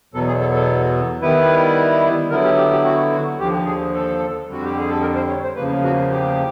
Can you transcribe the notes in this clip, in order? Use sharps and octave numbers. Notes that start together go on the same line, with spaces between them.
E2 B2 F#3 B3 A4
G#4
A4
A4
D#3 G3 B3 E4 B4
D3 F#3 B3 E4 A#4
G4
G4
G4
F#4
F#4
D#2 D3 F3 G4
G#4
A4
F2 D3 G3 F#4
G4
G#4
A4
A#4
C5
C#5
C5
E2 C#3 F3 A#3 B4
F#4
G4